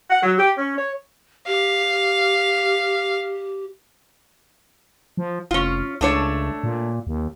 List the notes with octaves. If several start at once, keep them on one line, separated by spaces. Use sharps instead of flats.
F#5
F#3
G4
C#4
C#5
G4 F5
F3
F1 C#4 F4
C#2 A3 D4 C#5
A#2
D#2